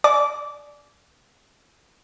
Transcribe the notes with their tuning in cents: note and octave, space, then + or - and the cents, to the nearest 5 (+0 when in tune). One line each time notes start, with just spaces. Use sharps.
D5 +5 G#5 +40 D6 -15